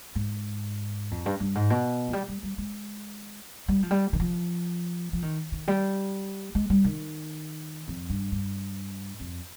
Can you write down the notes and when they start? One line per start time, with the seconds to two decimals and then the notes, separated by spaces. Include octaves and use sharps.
0.15 G#2
1.11 F2
1.26 G2
1.40 G2
1.55 G#2
1.70 B2
2.08 F3
2.13 G3
2.28 G3
2.43 G3
2.58 G#3
3.68 G3
3.83 F3
3.91 G3
4.13 D#3
4.20 F3
5.13 F3
5.22 D#3
5.52 D#3
5.68 G3
6.55 G#3
6.70 G3
6.84 D#3
7.88 F2
8.10 G2
8.32 G2
9.20 F2